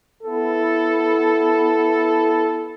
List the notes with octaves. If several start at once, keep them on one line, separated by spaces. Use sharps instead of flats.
B3 E4 A4